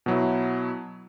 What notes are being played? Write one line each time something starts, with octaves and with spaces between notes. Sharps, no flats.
B2 F#3 E4